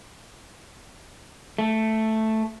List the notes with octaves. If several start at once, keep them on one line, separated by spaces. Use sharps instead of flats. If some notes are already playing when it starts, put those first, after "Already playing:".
A3